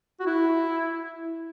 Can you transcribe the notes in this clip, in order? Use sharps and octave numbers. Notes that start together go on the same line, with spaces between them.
F#4
E4